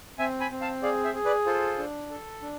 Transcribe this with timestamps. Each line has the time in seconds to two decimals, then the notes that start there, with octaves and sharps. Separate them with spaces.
0.18 C4 E5 G#5
0.40 G#5 B5
0.51 C4
0.61 F5 A5
0.83 G#4 D5 F5
1.04 C5 E5
1.14 G#4
1.25 B4 D5
1.46 F4 A4 C5
1.78 D4
2.10 A4
2.42 D4